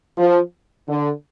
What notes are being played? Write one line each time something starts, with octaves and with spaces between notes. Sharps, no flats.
F3
D3